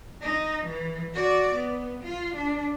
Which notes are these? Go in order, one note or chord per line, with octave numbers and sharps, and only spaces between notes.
D#4
E3
F#4 D5
B3
F4
D4